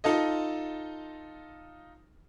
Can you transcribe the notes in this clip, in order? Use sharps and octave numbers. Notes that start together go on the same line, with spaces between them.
D#4 F4 A4 D#5